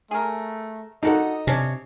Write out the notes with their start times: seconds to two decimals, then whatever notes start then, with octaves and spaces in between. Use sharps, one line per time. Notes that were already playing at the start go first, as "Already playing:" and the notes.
0.11 A3 G#4 A#4
1.03 D3 D#4 F#4 A4 D#5 F#5
1.47 C3 C#4 D4 C#5